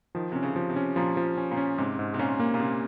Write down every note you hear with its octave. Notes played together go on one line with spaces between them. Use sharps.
D#3 F3
C3 C#4
C#3
F3
C3
C#4
A#2 F3
F3
C#4
A#2
C#4
G#2 C3
G#2
C3
A#2 C#4
A#3
A#2
C3 C#4